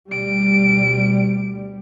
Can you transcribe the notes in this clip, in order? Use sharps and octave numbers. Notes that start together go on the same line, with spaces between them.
D2 B2 G3 D7